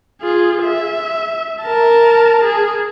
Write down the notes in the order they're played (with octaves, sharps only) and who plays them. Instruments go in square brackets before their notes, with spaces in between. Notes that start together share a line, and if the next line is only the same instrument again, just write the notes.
[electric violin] F4 G#4
E5
A#4 A5
G#4